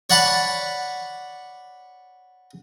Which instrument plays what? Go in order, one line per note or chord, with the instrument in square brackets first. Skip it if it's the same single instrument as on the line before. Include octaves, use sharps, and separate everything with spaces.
[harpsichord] C#5 D5 F#5 A5 B5 D6